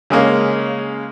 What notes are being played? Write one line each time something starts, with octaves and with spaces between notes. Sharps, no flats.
C#3 G#3 A#3 C#4